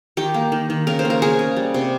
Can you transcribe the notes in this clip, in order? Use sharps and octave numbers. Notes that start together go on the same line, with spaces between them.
D#3 G4
A#3
D#3
D#3
C#3 A#4
C5
A#3
A#4
C#3 G#4
C#3
G3
C3